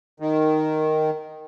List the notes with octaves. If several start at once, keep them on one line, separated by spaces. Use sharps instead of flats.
D#3